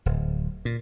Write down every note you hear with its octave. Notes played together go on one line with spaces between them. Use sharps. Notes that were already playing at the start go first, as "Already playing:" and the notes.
D1
A#2